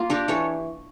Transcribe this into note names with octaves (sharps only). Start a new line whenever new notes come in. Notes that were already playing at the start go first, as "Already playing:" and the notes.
Already playing: A#3 F4
D4 G4 A#4
E3 A4 C#5